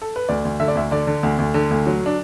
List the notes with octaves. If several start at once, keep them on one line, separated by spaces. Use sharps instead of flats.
A4
B4
D2 D5
D2
D3 E5
D5
D2 E5
D3 D5
D3
D2
D2
D3
D2
F#3
D4